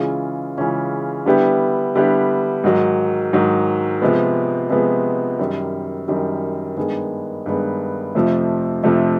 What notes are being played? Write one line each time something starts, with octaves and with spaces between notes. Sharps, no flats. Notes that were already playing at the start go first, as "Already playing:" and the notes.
Already playing: C#3 E3 G#3 C#4 F4
C#3 E3 G#3 C#4 F4
D3 G3 B3 E4 G4
D3 G3 B3 E4 G4
G#2 D#3 F#3
G#2 D#3 F#3
C3 F3 G#3 B3
C3 F3 G#3 B3
F#2 D#3 G3
F#2 D#3 G3
G2 D#3 G#3 B3
G2 D#3 G#3 B3
F2 C3 F3 A3
F2 C3 F3 A3